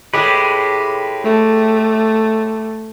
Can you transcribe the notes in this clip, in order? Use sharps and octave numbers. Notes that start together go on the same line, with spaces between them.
A2 G#3 G4 B4
A3